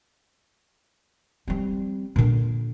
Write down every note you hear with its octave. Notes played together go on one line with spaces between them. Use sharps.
G3 C4
A#2 D3